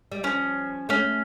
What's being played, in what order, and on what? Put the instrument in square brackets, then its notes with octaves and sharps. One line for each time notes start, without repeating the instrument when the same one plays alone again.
[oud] G3
[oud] F3 [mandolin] C#4
[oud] A3 [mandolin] C#4